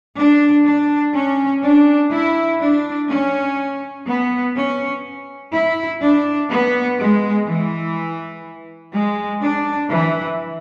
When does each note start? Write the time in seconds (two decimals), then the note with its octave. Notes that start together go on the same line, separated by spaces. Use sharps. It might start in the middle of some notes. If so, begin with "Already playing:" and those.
0.18 D4
0.66 D4
1.15 C#4
1.63 D4
2.12 E4
2.61 D4
3.09 C#4
4.06 B3
4.55 C#4
5.53 E4
6.01 D4
6.50 B3
6.98 G#3
7.46 E3
8.93 G#3
9.41 D4
9.90 E3